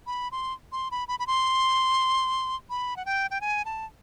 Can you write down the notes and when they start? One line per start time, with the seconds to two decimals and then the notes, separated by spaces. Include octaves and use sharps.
0.07 B5
0.32 C6
0.72 C6
0.91 B5
1.08 B5
1.19 B5
1.27 C6
2.70 B5
2.97 F#5
3.06 G5
3.31 G5
3.41 G#5
3.65 A5